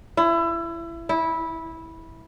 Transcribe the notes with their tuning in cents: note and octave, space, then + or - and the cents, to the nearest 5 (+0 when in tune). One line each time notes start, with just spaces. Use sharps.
E4 +25
E4 -15